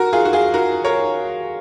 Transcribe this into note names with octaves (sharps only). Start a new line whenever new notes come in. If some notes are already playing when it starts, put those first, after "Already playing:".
Already playing: F#4 A#4
F4 G#4
F#4
F4 G#4
F#4 A#4
A#4 C#5